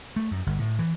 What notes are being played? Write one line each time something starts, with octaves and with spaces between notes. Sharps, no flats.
A3
F#2
G1
A2
E3